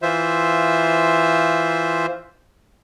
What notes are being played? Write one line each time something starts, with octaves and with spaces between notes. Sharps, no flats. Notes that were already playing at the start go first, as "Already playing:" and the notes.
E3 F4 C5 E5